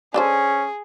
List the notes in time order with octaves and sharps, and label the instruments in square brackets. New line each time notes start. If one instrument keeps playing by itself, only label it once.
[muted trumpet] C#4 [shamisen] D4 A4 C5 [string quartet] G#4